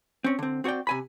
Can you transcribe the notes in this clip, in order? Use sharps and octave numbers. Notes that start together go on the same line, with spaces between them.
C4 C#4
D3 C4
C4 F#4 C#5 D5 G5
C3 G#5 B5